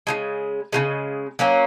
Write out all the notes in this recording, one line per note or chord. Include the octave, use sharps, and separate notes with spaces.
C#3 F3 G#3
C#3 F3 G#3
F#3 A#3 C#4